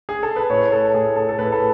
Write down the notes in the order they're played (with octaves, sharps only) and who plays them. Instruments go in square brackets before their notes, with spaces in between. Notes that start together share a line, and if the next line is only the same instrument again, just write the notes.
[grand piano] G#4
A4
B4
A2 C#5
A4
A2 G#4
A4
A4
A2 B4
A4